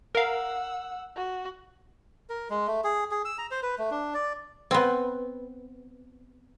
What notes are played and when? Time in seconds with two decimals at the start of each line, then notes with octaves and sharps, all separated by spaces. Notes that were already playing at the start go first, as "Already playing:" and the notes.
0.15 A#4 F5 F#5 E6
1.16 F#4
2.30 A#4
2.50 G#3
2.67 A3
2.84 G#4
3.11 G#4
3.25 E6
3.38 A#5
3.51 C5
3.63 B4
3.78 A3
3.91 D4
4.14 D5
4.71 B3 C4